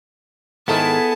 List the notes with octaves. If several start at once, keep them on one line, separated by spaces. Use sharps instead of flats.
G#2 D#3 B3 E4 G#4 A4 A5